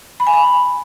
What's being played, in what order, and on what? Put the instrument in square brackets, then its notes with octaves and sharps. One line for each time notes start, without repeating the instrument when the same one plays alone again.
[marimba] B5
G#5
B5